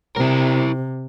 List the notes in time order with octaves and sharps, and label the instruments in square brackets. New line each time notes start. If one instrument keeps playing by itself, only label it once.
[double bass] C3 [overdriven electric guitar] E4 A#4